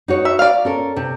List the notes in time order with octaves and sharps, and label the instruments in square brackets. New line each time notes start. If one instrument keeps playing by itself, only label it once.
[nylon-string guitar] D#4 F#4 C#5
[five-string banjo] E5
D5 F5
[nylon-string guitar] C#4 A4 A#4
C3